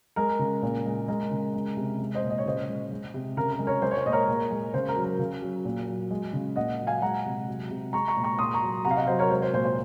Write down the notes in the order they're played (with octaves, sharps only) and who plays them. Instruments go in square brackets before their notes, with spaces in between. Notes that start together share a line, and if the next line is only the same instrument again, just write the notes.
[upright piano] G#3 A#4
C#3
A#2
G#3
G#3 A#4
C#3
G#3
C3
G#3
C5 D#5
A#2
D#5
C#5
C#3 C5 D#5
G#3
G#3
C3
C#3 A#4
A#4
G#3
A#4 C#5
G#3 C5
C#5
C5
A#2 D#5
A#4 C#5
A#2
G#3
C#3 C5
A#4
F#3
A#4
C#3
F#3
A#2
F#3
G#3
C#3
A#2 D#5 F#5
F#3
F5 G#5
G#3 F#5 A#5
C3
F#3
C3
G#3 A#5 C#6
A#5 C#6
A#2
A#5 C#6
A#2 C6 D#6
A#5 C#6
F#3
C3 F#5 A#5
F5
D#5 F#5
F5
F#3 C5 D#5
A#4 C#5
G#3 C5
C5
A#2 C5
C5